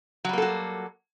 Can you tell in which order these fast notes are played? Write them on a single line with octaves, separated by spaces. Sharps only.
F#3 G3 A#3 A4 F#4